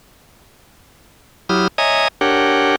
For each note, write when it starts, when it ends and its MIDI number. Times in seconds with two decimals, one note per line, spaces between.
1.49 1.68 54
1.49 1.68 64
1.49 1.68 67
1.49 1.68 87
1.49 1.68 89
1.78 2.08 73
1.78 2.08 75
1.78 2.08 76
1.78 2.08 80
1.78 2.08 82
1.78 2.08 87
2.21 2.76 62
2.21 2.76 67
2.21 2.76 70
2.21 2.76 73
2.21 2.76 78
2.21 2.76 79